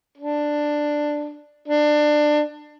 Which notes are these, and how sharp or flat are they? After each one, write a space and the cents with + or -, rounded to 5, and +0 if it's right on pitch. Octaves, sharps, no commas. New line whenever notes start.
D4 +5
D4 +20